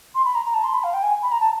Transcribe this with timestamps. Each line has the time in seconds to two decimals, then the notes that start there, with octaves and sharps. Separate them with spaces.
0.15 C6
0.25 B5
0.35 A#5
0.45 A#5
0.54 A5
0.64 C6
0.74 B5
0.84 F5
0.94 G5
1.03 G#5
1.22 B5
1.32 A#5
1.41 A5